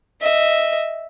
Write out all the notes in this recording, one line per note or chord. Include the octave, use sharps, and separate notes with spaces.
D#5 E5